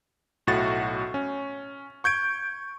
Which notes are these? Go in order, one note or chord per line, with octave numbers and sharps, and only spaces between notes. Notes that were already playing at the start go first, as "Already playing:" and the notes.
B1 A2 F#4 A6
C#4
C#6 G6 G#6 D7